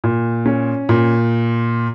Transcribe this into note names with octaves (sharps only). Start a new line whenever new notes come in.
A#2
C#4
A#2